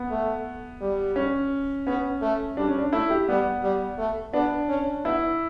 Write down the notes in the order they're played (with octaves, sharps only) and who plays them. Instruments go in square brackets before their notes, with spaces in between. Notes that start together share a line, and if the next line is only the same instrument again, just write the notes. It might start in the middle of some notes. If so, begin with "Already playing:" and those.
Already playing: [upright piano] B3
[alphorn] A3
G3
[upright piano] C#4
[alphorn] B3 [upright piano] C#4
[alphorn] A3
[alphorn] G3 [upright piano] D4
[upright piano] C#4
D4
[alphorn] A3 [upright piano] E4
[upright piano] G4
[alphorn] G3 [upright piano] B3
[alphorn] G3
A3
[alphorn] B3 [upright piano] D4
[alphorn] C#4
[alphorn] B3 [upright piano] E4